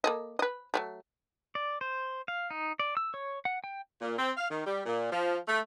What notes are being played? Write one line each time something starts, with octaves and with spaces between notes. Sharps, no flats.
A#3 A4 D#5
B4 D#5
F#3 G#3 A3
D5
C5
F5
D#4
D5
E6
C#5
F#5
G5
A#2
C4
F5
D#3
G3
A#2
F3
A3